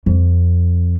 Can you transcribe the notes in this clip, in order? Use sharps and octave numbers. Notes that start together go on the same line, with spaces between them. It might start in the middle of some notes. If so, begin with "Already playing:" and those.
F2